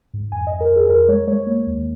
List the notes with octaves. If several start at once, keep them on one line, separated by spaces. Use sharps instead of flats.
G#2
F2 G#5
F2 D#5
A#4
F2
G#4
F2 A#4
G#3 C#5
G#3 C#5
A#3
D#2